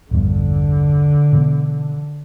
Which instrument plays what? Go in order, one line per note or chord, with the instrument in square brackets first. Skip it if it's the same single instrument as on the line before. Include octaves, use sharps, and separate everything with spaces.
[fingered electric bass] A#1 E2 G2 [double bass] D3
[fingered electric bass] B2 E3 B3